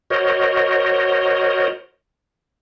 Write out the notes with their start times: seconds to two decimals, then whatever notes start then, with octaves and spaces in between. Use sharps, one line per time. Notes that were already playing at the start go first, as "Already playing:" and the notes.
0.10 F#4 A#4 C5 C#5 D#5